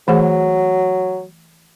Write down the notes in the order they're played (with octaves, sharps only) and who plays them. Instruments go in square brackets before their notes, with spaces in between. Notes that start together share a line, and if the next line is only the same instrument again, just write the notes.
[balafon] E3 A3 G#4 [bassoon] F#3